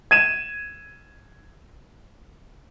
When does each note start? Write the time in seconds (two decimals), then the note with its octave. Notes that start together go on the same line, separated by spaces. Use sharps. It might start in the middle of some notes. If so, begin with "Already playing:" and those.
0.11 G#6 D#7 E7